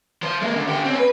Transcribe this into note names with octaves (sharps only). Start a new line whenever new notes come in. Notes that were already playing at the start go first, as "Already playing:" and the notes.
F3 C5
G#3 A#3
D2 D3
D3 G4
C4 C#4
B4